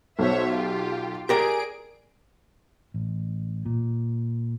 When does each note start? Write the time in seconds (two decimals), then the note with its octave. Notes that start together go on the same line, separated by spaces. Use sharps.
0.19 B1 C5 C#5 E5
0.49 F4 G4
1.29 G4 G#4 A#4 D5 D7
2.94 A1
3.66 A#2